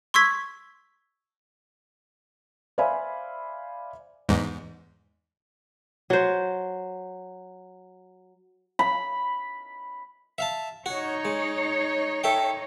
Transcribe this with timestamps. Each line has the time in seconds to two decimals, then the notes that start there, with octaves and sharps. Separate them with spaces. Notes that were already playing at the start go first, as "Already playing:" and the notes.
0.14 C6 C#6 E6 G#6 B6
2.78 C5 D5 E5 F5 G#5 B5
4.29 E2 G#2
6.10 F#3 C5
8.79 B5
10.38 E5 F5 A5
10.86 D#4 F#4 C#5
11.25 G#3
12.24 A4 E5 G5